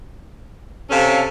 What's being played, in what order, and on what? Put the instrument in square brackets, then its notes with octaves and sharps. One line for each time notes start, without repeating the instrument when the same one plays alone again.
[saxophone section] C3 C#4 [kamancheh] A4 F5